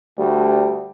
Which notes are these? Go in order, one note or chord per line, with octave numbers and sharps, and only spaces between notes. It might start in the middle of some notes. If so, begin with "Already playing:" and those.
D2 G3